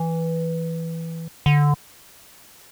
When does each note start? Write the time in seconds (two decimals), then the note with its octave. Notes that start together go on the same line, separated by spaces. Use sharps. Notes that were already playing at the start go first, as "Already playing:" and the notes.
Already playing: E3
1.46 D3